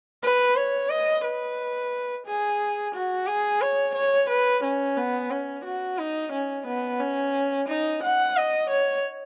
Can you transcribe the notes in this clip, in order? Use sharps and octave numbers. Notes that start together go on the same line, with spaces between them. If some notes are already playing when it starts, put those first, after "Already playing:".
B4
C#5
D#5
B4
G#4
F#4
G#4
C#5
C#5
B4
C#4
B3
C#4
F#4
D#4
C#4
B3
C#4
D#4
F#5
D#5
C#5